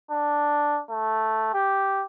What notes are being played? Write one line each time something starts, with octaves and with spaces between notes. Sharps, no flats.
D4
A3
G4